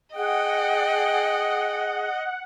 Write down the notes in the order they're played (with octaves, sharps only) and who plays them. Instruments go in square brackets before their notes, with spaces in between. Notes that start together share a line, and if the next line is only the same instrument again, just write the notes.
[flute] G#4 [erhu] D#5 [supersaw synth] F#5 [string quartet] G5